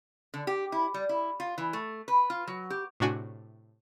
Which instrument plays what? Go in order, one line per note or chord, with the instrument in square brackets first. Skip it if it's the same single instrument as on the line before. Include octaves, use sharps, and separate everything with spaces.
[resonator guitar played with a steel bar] D3
G4
E4
G3
E4
F4
E3
A3
B4
F4
F#3
G4
[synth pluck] A2 C3 D4 F#4 G#5